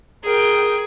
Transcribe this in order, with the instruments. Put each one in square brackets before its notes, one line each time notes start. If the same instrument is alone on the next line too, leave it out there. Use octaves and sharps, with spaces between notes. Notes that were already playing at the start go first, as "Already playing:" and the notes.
[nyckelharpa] G#4 [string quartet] A#4 G5